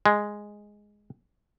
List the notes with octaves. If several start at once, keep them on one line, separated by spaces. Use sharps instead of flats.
G#3